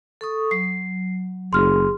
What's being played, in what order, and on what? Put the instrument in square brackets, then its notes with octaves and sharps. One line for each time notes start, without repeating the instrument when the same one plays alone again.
[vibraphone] A4 C#6 D#6
[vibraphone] F#3 [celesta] C7
[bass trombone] F#1 [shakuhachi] G#4 [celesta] C6 F6